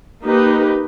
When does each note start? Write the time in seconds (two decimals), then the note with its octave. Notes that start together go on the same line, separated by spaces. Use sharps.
0.22 A#3 D#4 G4 B4